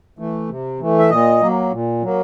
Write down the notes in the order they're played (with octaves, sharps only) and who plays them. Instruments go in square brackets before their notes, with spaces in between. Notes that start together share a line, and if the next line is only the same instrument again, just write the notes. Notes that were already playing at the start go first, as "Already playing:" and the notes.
[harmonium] E3 A3
C3
E3 A3
E5
A#2 D#5
F#3 A#3
A#2
F#3 A#3